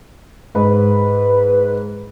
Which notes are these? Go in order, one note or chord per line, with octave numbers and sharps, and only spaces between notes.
G#2 B4